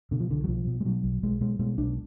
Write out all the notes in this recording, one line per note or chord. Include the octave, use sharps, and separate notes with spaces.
B2 D3
F3
B1 D3
F#3
B1 F3
B2
G#3
B2 F#3
B1
B1 G#3
B2 G#3
B2 G#3
B1 D4